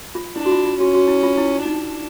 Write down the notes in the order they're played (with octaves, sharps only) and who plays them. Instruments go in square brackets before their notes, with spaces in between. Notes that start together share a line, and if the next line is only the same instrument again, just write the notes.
[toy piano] F4
[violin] D4 [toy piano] E4
[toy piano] F#4
F4
F4
[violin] C#4 [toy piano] F#4
[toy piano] F#4
E4
F4
E4
[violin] D4 [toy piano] D#4